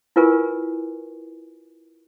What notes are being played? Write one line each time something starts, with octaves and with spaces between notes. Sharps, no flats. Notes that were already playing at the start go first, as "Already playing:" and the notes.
E4 F4 A#4 B4 G#5 C#6